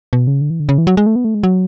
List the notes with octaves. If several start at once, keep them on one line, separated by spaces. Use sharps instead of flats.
B2
C#3
D3
E3
D3
C#3
E3
F#3
G#3
A3
B3
A3
G#3
F#3